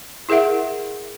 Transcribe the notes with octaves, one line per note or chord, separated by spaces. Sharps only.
E4 G#4 A#4 E5 F#5